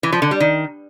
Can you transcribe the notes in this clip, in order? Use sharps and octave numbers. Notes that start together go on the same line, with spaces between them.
E3
F3
D3
G3
D#3